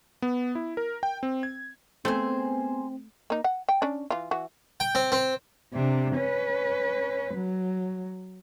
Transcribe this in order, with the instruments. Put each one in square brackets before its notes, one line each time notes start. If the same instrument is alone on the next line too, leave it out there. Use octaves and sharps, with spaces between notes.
[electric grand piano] B3
E4
A#4
G5
C4
G#6
[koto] A3 [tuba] B3 [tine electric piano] C4 [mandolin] G#4 C5
[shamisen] A#3 D#4
F#5
G5
C#4 D4
E3 F4
E3 F#4
[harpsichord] G5
C4
C4
[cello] C3 D4
C#4 B4
F#3